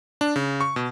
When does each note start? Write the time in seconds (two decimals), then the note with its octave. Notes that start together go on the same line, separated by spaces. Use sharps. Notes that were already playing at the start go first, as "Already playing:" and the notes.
0.21 D4
0.36 C#3
0.61 C#6
0.76 B2